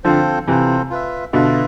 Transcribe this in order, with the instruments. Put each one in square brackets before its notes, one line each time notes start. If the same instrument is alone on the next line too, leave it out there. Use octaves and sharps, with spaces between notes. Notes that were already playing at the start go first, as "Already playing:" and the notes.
[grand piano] D3 F3 [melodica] C4 F4 A4 C5
[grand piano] C3 E3 [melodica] C4 F4 A4 C5
[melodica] F4 B4 E5
[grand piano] B2 D3 [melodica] F4 B4 E5